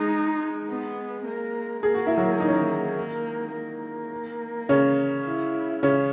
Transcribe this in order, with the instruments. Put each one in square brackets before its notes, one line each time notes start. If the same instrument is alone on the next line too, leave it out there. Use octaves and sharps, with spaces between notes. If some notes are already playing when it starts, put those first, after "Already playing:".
Already playing: [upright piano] G#3 [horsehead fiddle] D#4
[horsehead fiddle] B3
A#3
[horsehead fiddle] A#3 [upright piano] G#4
[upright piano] F#4
E4
F#3 F#4
D#4
C#4
D#3 D#4
[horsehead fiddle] A#3
A#3
[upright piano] C#3 C#4
[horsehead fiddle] E4
[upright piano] C#3 C#4